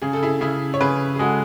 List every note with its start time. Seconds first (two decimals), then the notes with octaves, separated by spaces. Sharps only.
0.02 C#3 G#4
0.13 A4
0.23 E4 G#4
0.41 C#3 E4 G#4
0.74 C#5
0.81 C#3 G#4 B4
1.16 G#4
1.19 G#3 F#4 A4